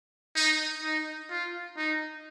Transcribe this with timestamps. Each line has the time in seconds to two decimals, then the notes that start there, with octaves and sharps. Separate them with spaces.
0.36 D#4
0.83 D#4
1.30 F4
1.77 D#4